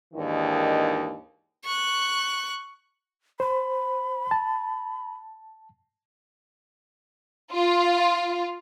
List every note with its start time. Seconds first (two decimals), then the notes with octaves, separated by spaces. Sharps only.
0.13 D#2 G#2 D#3 E3 D4 D#5
1.65 C#6 F#6
3.40 C5 B5
4.31 A5
7.53 F4